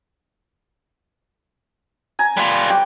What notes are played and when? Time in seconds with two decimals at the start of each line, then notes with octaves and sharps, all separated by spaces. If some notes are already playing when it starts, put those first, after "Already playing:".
2.19 G#5 A#5
2.37 G3 F4 B4
2.69 G4 G5 D6